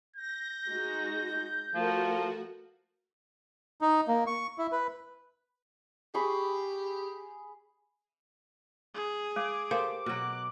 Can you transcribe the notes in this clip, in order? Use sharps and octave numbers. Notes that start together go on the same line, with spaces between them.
G6 A#6
G#3 D#4 F#4
F3 A3 F#4 A#4
D#4
A#3
C#6
E4
B4
G4 G#4 B5 C#6
G#4
G#3 D6
G4 A4 A#4 C5 F5
B2 F#3 F#6